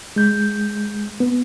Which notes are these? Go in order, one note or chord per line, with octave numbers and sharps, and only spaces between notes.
G#3 G6
B3